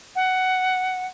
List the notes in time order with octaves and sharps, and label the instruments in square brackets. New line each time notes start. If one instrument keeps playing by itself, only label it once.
[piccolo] F#5